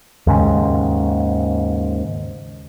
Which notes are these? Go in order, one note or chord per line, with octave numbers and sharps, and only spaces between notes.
D#2 G#2 C#3